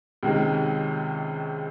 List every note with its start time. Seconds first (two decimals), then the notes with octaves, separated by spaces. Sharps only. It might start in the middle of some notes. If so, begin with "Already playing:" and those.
0.23 C#2 C3 D#3 G#3